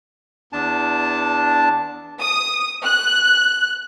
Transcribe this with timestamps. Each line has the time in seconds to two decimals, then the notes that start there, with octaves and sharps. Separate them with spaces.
0.53 E2 D4 A5
2.20 D#6
2.88 F#6